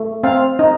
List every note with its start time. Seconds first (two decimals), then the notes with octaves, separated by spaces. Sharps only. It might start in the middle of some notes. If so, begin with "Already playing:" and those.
Already playing: A3
0.24 C4 F5
0.59 D#4